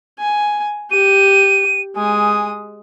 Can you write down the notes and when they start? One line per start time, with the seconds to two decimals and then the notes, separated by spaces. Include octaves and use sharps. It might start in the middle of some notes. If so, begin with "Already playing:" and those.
0.19 G#5
0.91 G4 D#7
1.96 G#3 G#5 D#6